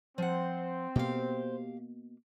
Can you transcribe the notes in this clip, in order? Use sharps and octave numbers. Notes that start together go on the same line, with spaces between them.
F3 C4 C5 F#5
B2 A#3 G4 F5